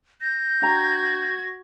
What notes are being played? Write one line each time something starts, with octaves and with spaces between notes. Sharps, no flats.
G6 A#6
D4 F#4 G5 A#5 G#6